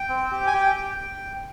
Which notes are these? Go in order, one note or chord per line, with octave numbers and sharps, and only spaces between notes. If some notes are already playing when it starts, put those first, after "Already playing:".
Already playing: G5
C4
G4
G#5
G4 G5
G4